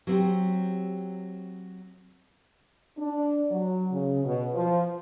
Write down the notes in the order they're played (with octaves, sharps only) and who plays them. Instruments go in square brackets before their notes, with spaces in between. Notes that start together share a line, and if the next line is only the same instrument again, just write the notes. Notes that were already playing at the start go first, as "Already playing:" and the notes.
[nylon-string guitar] F#3 C4 G4
[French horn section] D4
F#3
C#3
B2
F3